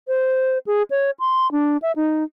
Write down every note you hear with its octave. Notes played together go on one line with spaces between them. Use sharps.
C5
G#4
C#5
C6
D4
E5
D#4